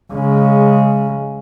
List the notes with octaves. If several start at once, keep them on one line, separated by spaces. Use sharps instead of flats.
C#3 G#3